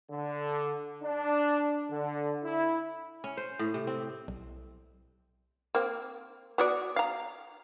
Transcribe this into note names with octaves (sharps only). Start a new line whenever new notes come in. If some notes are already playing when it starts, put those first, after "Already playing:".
D3
D4
D3
E4
C#4
C5
A2
C3
C4
B1
A#3 C4
B3 F#4 D5
F5 A#5